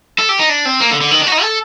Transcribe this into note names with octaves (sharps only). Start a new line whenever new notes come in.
A4
G4
D#4
D4
C4
A#3
D3
D3
D#3
D4
F#4
D#4
A4